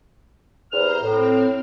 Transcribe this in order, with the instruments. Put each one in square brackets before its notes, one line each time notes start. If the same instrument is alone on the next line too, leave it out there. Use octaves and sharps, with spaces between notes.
[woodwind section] E2 C3 F6 [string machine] C5 A#5
[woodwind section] A2 [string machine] C4 F6